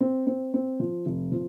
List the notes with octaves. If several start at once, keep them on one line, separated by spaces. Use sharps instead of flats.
C4
C4
C4
F3
F1
F3